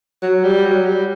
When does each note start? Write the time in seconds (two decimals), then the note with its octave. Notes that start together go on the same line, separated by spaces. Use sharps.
0.23 F#3
0.44 G3
0.66 F#3
0.86 G3